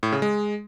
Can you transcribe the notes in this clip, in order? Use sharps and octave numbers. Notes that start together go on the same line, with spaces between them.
A2
C#3
G#3